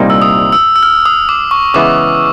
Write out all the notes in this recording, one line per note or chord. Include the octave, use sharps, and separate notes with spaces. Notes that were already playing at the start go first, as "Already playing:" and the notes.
Already playing: C2 A#2 G3 A#3 D#4
E6
D#6
E6
E6
F6
D#6
D6
C#6
C#3 E3 G#3 B3 E4 D6